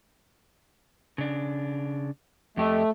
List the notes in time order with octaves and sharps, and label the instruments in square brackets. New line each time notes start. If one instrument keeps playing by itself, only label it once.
[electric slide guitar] C#3 D4
[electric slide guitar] F2 G4 D#5 [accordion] A3